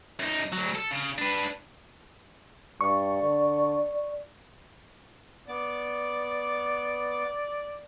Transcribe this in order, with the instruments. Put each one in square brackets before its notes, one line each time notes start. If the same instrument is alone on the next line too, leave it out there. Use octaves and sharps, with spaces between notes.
[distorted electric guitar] F#2 D#4
D2 F#3
A4
C#3
D4 B4
[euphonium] G2 [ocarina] D5 [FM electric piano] C#6
[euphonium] D3
[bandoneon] B3 D6 [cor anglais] D5